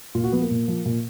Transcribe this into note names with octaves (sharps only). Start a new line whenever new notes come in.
A#2 F4
F#4
F3 B3
A#3
A#2
F3
A#2